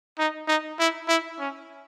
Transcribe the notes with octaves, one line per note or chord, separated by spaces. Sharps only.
D#4
D#4
E4
E4
C#4